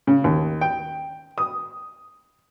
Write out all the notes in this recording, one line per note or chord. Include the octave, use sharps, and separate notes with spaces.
C#3
D#2
G5
D#6